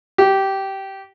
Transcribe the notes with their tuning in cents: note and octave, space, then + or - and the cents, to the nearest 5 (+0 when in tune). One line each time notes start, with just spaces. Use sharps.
G4 -15